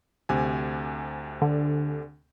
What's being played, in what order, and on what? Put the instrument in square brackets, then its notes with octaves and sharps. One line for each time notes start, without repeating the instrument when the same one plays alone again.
[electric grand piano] D2 C3 G#5
[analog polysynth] D3